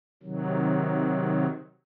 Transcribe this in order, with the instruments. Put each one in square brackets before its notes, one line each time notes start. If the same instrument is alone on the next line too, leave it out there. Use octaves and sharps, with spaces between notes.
[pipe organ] C3 D#3 F#3